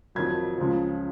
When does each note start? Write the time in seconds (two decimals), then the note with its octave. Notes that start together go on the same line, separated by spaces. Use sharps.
0.15 F2 D#3 F#3 G#6
0.58 C#2 C#3 F3